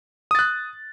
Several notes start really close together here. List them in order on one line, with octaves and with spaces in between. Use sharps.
D#6 A6 F#6